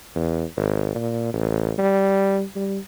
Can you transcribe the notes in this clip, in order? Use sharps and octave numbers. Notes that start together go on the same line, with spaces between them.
E2
G#1
A#2
A1
G3
G3